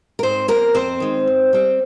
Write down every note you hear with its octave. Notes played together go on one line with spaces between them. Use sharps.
A#4
G#2 C4 C5
F3 A#3 C4 A#4
F2 C4 C5
D#3 G#3
G#2
G3 C4